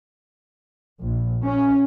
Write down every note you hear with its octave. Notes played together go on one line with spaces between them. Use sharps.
A#1
C#4